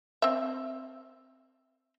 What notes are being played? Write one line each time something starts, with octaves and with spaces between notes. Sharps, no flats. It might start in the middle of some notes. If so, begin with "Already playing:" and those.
C4 E5